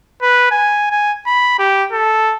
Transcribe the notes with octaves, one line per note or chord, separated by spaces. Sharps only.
B4
G#5
G#5
B5
G4
A4